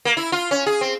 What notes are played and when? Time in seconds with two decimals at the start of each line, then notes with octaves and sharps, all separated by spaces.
0.05 A#3
0.17 E4
0.32 F4
0.51 C#4
0.66 G#4
0.81 C4